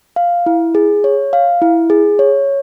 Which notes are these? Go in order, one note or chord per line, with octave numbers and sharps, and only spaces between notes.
F5
E4
G#4
C#5
F5
E4
G#4
C#5